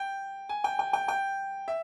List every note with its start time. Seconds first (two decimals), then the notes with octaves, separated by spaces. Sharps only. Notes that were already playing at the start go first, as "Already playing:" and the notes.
Already playing: G5
0.49 G#5
0.64 G5
0.79 G5
0.93 G5
1.08 G5
1.68 E5